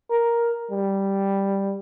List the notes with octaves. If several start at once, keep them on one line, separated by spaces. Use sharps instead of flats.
A#4
G3